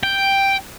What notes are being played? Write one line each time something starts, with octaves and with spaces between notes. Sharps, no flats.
G5